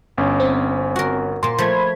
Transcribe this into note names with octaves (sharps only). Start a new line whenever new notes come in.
G1 C#4
C4
F#4 A#4
A#2 A#3 C6
F3 A3 B5 G#6